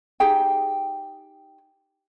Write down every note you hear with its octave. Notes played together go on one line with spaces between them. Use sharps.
D#4 G4 G#4 G5